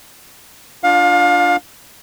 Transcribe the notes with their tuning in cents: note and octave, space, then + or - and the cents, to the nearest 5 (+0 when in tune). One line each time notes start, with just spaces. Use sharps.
D4 +0 F4 +0 F5 +30